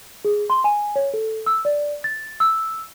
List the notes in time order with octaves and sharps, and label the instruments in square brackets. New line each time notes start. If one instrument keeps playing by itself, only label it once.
[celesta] G#4
C6
G#5
C#5
A4
E6
D5
A6
E6